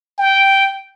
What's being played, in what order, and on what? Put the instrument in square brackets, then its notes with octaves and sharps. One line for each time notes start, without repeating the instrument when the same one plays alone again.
[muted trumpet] G5